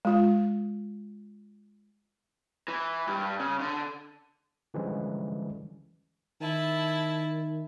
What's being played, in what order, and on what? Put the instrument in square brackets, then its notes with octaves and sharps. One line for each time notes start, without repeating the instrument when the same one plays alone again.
[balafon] G#3 F4
[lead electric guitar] E3
G2
C#3
D3
[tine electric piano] D3 E3 F3 G3 G#3 C#4
[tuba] D#3 [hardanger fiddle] E4 A5